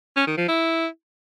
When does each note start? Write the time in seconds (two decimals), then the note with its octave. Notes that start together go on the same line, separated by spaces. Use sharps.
0.17 C#4
0.27 D#3
0.38 F3
0.48 E4